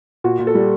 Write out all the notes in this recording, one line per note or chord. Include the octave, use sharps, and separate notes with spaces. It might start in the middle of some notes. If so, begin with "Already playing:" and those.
A#2 F#4
A#2
A4
G3